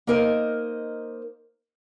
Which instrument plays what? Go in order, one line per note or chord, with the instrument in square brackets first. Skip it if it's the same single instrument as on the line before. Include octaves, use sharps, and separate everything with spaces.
[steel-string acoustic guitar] A#3 D#4 A#4 C5 D#5